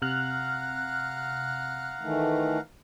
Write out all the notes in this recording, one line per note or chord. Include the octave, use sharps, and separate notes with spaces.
C3 F5 F#5 A#5 F6 F#6
D#3 E3 A3